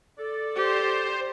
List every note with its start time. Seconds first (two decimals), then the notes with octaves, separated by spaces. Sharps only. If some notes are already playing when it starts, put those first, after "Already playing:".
0.19 A4 D5
0.56 G4 C5